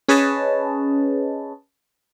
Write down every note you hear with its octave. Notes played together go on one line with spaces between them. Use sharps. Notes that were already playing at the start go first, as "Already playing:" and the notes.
C#4 G#4 B4 C#5 D#5 A5